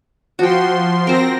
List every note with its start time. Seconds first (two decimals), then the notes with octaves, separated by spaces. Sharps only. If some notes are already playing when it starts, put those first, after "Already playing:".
0.39 F3 F#4 G5 C6
1.07 C4 A#4 C5 A#6